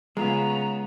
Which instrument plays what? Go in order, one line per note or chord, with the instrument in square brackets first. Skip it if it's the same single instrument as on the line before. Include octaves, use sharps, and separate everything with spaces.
[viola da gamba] C#3 B3 [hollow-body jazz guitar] G#3 F4 G#4 [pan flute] A#5